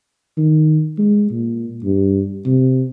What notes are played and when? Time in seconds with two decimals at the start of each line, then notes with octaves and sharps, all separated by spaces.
0.37 D#3
0.98 G#3
1.30 A#2
1.84 G2
2.45 C3